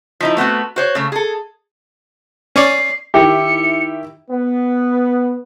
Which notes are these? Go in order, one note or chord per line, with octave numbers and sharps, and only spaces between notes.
F3 D#4 E4
A3 B3 C4 F#4
F#4 C5 C#5
C#3 A3
G#4 A4
C#4 C#5 D5 C7
D#3 E4 G4 C#7
B3